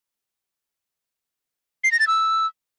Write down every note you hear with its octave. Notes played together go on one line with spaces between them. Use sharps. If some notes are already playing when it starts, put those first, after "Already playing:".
C7
A#6
A6
E6